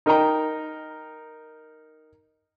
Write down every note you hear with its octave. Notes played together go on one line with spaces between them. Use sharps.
D#4 A#4 D#5 G5 A#5